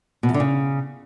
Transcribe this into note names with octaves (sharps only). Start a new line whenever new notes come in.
B2
E2
D3
C#3